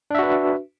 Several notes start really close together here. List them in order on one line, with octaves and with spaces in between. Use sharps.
D4 E5 F#4 B4